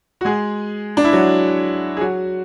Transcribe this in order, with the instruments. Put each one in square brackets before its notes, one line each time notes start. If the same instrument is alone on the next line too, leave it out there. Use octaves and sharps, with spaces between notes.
[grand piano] F#4
G#3 G#4
D4
E4
F#3 F#4
G#4
F#3 F#4